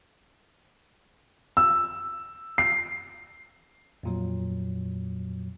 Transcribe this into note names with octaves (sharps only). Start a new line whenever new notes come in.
E6
C7
F2 A#2 F#3